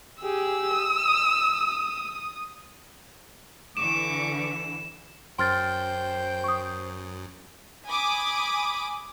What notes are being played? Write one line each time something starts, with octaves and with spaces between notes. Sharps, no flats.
G4 G#4 E6
D#6
D3 E3 C#6 D6 E7
F#2 C5 G5 C6 F6 A6
C#6 D#6
G#5 B5 D6 D#6